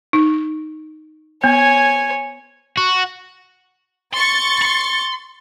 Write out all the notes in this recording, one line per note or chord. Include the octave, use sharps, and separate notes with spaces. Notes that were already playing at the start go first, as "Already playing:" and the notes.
D#4
B3 C#5 G#5
F#4
C6 C#6 A6
B5 C6